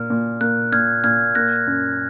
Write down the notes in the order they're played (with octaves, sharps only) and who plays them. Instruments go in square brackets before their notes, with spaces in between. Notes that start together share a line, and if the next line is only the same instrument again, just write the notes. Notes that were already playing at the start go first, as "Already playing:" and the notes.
Already playing: [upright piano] A#2 A#3 [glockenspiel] F6
[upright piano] A#2
[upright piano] A#3 [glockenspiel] F#6
[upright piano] A#2 [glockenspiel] F6 G#6
[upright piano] A#2 [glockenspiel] F6 G#6
[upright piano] A#3 [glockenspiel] F#6 A#6
[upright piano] F#2